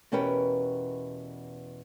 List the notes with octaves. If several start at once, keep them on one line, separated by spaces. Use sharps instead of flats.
E2 B2 C#4 G4 A#4 B4